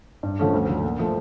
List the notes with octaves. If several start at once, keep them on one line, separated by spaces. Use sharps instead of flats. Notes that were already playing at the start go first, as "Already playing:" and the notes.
G2
D3 F3 A3 C#4
D2
D3 F#3
A#2
F3 A3